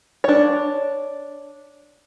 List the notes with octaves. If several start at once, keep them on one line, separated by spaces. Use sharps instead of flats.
D4 C#5